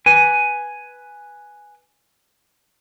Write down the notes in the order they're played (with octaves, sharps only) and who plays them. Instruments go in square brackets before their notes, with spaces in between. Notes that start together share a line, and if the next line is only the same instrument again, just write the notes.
[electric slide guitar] B4 G#5